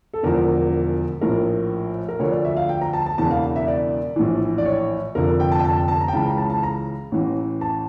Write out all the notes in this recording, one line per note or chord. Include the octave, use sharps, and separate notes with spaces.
A4
E1 E2 D3 F3 A#4
A#1 A2 F3 A#4
A#4
D2 D3 F3 C#5
D5
E5
F5
G5
A#5
A5
A5
E1 E2 C#3 E3 A5
F5
E5
D5
A#1 A2 E3
D5
C#5
F1 F2 D3 F3 A#4
G5
A5
G5
A5
A5
A5
A#5
G5
C#2 C#3 E3 A5
A#5
A5
A5
A#5
A1 A2 E3
A5